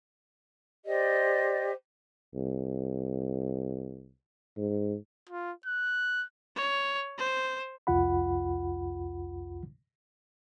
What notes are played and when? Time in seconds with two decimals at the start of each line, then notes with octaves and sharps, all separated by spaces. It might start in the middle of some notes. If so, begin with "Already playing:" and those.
0.86 G4 C5 D5 D#5
2.34 C2
4.57 G#2
5.29 F4
5.66 F#6
6.56 C#5
7.18 C5
7.87 C2 F2 F4 F#5 B5